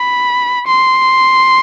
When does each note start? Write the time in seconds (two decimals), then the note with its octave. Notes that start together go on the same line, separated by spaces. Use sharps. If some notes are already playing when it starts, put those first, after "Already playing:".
Already playing: B5
0.67 C6